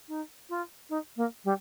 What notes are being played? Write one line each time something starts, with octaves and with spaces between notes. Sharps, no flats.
D#4
F4
D#4
A#3
G3